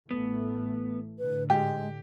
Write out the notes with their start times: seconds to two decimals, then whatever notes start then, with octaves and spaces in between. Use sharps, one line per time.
0.11 A1 E3 A3 B3
1.19 A2 D3 B4
1.50 G#2 G#3 G4